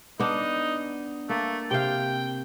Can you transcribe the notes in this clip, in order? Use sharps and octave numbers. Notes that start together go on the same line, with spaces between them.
B3 D4 D#4
A3 A#3
C3 F5 G5